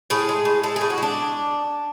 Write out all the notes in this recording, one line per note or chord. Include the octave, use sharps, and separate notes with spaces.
A2 G#4
G#3
A2
G#3 A4
A2 G#4
F#4
G#3 D4